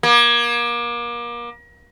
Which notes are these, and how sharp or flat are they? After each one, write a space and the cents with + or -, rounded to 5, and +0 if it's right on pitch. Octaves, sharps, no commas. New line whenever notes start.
A#3 +35